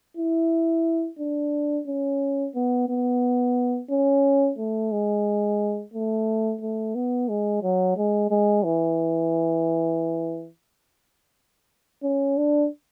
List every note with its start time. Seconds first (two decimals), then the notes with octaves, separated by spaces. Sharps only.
0.17 E4
1.19 D4
1.87 C#4
2.55 B3
2.89 B3
3.90 C#4
4.58 A3
4.92 G#3
5.94 A3
6.61 A3
6.95 B3
7.29 G#3
7.63 F#3
7.97 G#3
8.31 G#3
8.65 E3
12.03 C#4
12.37 D4